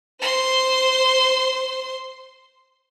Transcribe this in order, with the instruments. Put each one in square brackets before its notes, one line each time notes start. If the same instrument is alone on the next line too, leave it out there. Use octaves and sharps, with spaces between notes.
[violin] C5 C6